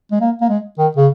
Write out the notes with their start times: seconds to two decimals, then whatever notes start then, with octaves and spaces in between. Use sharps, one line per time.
0.11 G#3
0.21 A#3
0.41 A#3
0.49 G#3
0.78 D#3
0.97 C#3